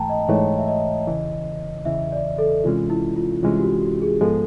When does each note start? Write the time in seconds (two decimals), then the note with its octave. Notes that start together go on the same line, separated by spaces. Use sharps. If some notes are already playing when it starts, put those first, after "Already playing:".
Already playing: G#2 E3 A3 G5 A5 A#5
0.09 D#5
0.28 G#2 E3 A3 C#5
0.58 E5
0.68 D#5
1.07 E2 C#3 E3
1.85 E2 C#3 E3 E5
2.12 D5
2.38 A4
2.64 C2 C3 E3 G#3 C#4 F4
2.90 E4
3.16 F4
3.42 C2 C3 E3 G#3 C#4 F4
3.58 G4
3.62 F#4
3.82 G4
4.02 G#4
4.21 G#2 F3 G#3 B3 A4